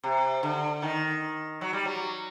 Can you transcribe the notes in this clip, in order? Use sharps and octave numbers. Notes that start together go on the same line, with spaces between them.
C3
D3
D#3
F#3
G3
F#3